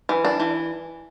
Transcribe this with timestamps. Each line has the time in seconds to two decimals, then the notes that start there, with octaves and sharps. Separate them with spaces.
0.09 E3
0.25 D4
0.40 E3